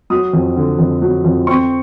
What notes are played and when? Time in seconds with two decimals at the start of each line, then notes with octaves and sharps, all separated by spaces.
0.10 F#3 D#6
0.33 F2
0.57 D3
0.79 F2
1.02 F#3
1.24 F2
1.47 C4 C#6